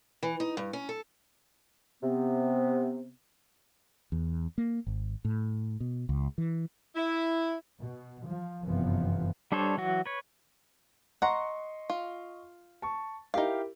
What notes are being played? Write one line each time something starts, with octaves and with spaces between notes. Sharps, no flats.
E3
D#4
G2
C#4
A4
C3 B3
E2
A#3
G#1
A2
B2
C#2
E3
E4
B2
F3
G1 F#2 C3 E3 F3 B3
G3 D4 A4 C5 C#5
E3 F#3 F#4
B4 C#5
D#5 F#5 A#5 C6 C#6
F4
A5 C#6
D#4 E4 G4 A#4 F5